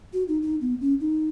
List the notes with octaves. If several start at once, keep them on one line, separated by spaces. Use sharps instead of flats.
F#4
D#4
D#4
B3
C#4
D#4